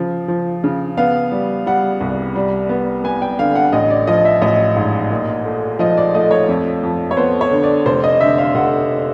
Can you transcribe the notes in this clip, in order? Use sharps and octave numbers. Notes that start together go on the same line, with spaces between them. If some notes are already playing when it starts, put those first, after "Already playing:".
Already playing: C#3 F3
F3
C#3
B3 F5
G3
G3 F#5
C2
G3
B3
B3 G#5
G5
D3 F5
F#5
A1 D#5
D5
F3 D#5
E5
A1 D#5
G#2
A#2
A3
F3 D#5
D5
A3 D#5
C#5
F2
F2
C#5
B3 C5
C#5
D3
D5
F1 C5
D#5
D3 E5
F5
F1 F#5